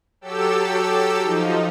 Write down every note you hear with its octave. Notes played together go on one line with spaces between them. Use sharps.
F#3 G4 A4 E6
F3 D#4